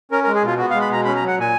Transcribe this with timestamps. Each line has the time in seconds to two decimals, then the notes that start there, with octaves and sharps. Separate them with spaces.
0.11 C#4 A#4
0.24 A#4
0.27 G#3
0.35 G#4
0.43 B2 F4
0.58 B3 F#4
0.70 F5
0.74 G#3
0.81 B5
0.89 B2 A#5
1.05 C#4 B5
1.16 A#5
1.21 F#3
1.28 F#5
1.36 A#2 G#5